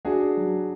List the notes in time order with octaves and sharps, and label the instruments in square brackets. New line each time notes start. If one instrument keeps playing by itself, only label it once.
[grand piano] D4 F#4 G#4
F#3